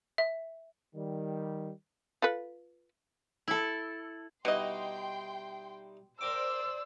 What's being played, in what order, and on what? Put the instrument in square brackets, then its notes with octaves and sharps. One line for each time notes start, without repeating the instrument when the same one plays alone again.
[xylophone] E5
[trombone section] D#3 G3
[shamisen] F4 A4 B4
[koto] E4 A4
[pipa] B2 D#5 [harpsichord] G3 D#4 E4 [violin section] G5 C6
[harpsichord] A#4 G5 D6 [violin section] C5 D5 [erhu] E6